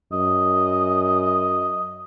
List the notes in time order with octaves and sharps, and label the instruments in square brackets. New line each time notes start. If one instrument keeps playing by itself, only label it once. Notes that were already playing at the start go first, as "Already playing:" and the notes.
[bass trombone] F#2 [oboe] D#5